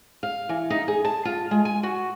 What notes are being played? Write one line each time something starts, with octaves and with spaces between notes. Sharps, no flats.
F5
E3
D#4
G#4
A5
F4
G#3
G#5
F#4